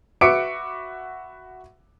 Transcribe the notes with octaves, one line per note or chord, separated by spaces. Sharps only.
F#4 B4 E5 D6 C#7 D7